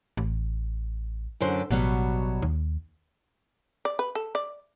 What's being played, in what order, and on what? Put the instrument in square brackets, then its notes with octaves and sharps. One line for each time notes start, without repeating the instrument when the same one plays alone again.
[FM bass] A1
[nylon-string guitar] F#2 D3 C5
[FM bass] A1 [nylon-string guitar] B2 F#3 G3
[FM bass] D#2
[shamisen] D5
B4
A4
D5